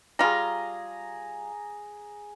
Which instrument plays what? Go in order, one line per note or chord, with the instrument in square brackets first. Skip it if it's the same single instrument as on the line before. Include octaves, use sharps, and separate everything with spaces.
[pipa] G3 F4 [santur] G#4 A#5